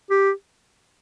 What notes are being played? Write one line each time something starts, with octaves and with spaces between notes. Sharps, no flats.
G4